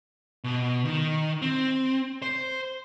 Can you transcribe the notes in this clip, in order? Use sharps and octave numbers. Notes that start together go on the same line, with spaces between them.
B2
D#3
C4
C5